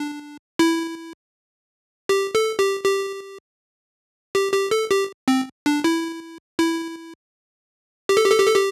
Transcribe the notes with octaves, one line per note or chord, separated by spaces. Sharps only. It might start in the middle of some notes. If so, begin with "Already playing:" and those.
Already playing: D4
E4
G4
A4
G4
G4
G4
G4
A4
G4
C4
D4
E4
E4
G4
A4
G4
A4
G4
A4
G4